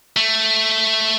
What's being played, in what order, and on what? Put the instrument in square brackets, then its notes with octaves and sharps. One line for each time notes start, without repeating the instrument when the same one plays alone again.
[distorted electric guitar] A3